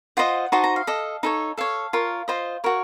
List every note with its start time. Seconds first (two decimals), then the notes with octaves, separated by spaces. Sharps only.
0.17 F4 C5 D#5 F#5
0.52 D#4 F#4 C5 D#5 A5
0.64 A#5
0.76 F5
0.87 A4 D#5
1.23 D#4 A4 C#5
1.57 A4 C#5 F5
1.93 F4 A#4 C#5
2.28 F4 C5 D#5
2.64 F#4 A#4 C#5